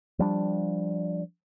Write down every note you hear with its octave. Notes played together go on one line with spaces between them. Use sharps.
F3 G3 D4